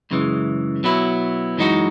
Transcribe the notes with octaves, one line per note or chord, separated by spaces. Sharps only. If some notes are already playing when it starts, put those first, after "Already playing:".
F#2 C#3 E3 G#3
B2 F#3 B3 E4
F#2 E3 G#3 D#4 F#4